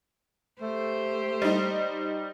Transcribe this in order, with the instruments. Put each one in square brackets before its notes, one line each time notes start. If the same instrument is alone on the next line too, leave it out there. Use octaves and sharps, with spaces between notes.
[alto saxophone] A3 [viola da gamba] G4 C5
[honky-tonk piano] G3 D#4